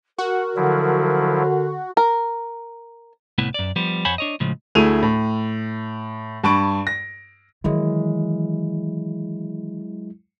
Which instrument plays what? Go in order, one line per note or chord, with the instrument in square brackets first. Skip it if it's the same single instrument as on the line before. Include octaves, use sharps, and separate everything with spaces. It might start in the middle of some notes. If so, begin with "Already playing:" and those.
[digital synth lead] F#4 [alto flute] A#4 [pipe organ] F#5
[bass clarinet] D3 [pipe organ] F3 F#3 E4
[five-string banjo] A#4
[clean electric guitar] C2 A2 B3 E4
F#2 D5
F3 G3 B3
F2 C5 C#5 F#5 G#5 B5
D4 C#5 D#5
A2 C#3 F3 G#3
[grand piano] D2 A3 E4 G#4 D#7 F7
A2
G2 A5 B5 C#6 D7
A#6
[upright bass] D#3 E3 [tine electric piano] F#3 G#3 E4